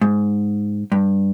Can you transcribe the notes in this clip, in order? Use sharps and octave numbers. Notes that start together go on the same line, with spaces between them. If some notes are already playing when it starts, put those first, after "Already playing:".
G#2
G2